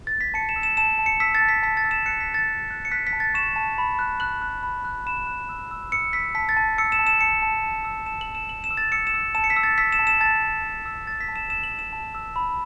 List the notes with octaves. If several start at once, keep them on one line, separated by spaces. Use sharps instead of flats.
A6
B6
A5 C#7
E7
E6
E7
A5 E7
A5
C#7
E6 B6
A6
A5
B6
A5 B6
A6
E6
E7
F#6 C#7
B6
A5
A6
F#6
F#6
C#7
F#6 B6
B6
A5
A6
C#6 E7
A5
B5
F#6
F#6 F#7
F#6
B5
F#6
B5 E7
F#6
E6
E6
E6 C#7
E6 B6
A5 B6
A6
A5
E6 C#7
E7
A5
E7
A5 C#7
A5
A5
E6
A5 E7
F#7
A5
E7
A5 F#7
E7
E6
A6
E6 C#7
E7
E6
A5 E7
C#7
B6
E6
A6
E6 B6
E7
A5
E7
A5 A6
A5
A5
E6
A5 A6
B6
A5
E7
E6 E7
F#7
E6
E7
A5
E6
B5